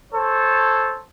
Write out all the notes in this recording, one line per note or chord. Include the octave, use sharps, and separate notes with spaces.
A4 C5 C#5